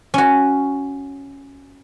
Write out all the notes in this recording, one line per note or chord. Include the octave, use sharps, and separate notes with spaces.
C#4 F#4